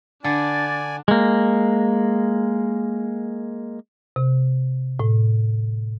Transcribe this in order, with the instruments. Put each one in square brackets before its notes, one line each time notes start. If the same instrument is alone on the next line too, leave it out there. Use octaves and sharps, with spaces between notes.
[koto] D3 [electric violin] D4 [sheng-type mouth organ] D5 G#5 [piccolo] A6
[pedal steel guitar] G#3 A#3
[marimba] C3
A2